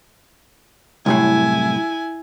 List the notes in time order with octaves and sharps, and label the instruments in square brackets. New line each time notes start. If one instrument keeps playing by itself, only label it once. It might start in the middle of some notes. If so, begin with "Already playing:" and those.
[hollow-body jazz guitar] C2 F#2 A2 [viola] E4 G#5